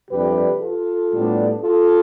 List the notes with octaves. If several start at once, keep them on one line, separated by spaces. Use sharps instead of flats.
F2 C3 G3 D4 G4 B4
F4 A4
A2 G3 B3 D4
F4 A4